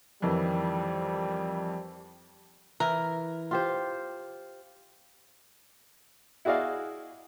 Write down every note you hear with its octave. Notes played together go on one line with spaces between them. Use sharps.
F2 D#3 E3 G3
E3 A#4
F4 G4 C5
E4 F#4 G#4 D5 D#5 F5